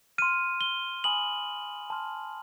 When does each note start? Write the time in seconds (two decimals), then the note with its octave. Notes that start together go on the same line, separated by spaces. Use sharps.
0.18 C6 F6 D#7
0.61 G7
1.04 G#5 B5 D#6 F#7
1.90 A5 C6 F6